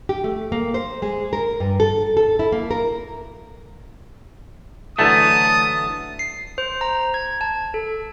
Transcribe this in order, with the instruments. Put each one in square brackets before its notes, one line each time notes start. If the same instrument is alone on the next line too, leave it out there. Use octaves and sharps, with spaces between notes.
[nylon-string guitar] G4
A3
A#3
C5
G#3
A#4
G2
A4
A4
E4
A#3
A#4
[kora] D3 E3 F#3 [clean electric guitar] A3 [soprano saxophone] A5 [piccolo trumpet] D#6
[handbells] C7
C5
A#5
G#6
A5
A4